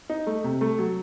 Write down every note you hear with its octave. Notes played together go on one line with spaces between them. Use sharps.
D#4
A3
C3
A3
F#3